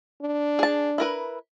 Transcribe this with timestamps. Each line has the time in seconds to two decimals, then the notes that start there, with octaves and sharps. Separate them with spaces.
0.23 D4
0.59 G#4 A5
0.98 E4 A#4 B4